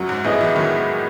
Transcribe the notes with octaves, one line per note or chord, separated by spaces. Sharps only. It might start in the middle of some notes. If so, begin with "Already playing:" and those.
Already playing: F#2 F#3
G#2
A2 B3 E4 G#4 D#5
E3
D#3 F#3